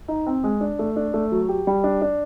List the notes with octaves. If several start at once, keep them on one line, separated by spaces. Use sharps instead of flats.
D#4
C4
G#3
D4
A3
D4
A3
F#3
G4
G3
D4
D4